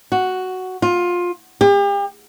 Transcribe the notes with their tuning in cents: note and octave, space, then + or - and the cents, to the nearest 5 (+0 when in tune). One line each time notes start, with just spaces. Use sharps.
F#4 +5
F4 +20
G4 +40